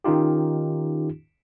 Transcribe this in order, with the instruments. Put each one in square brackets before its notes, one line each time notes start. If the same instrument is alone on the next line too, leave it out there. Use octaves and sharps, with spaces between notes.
[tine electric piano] D#3 C#4 D#4 F4 G4